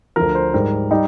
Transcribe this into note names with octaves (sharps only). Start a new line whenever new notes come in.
D2 D3 F3 A#4
C5
G#2 G3 A#4
G3 D#4